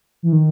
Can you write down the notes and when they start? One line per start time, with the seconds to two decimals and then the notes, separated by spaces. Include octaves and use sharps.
0.23 E3
0.32 D#3